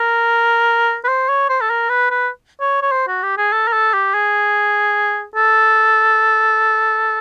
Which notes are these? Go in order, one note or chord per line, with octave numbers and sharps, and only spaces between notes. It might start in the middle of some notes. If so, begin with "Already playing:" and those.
Already playing: A#4
B4
C5
C#5
C5
A4
A#4
B4
B4
C#5
C#5
C5
F#4
G4
G#4
A4
A#4
A4
G4
G#4
A4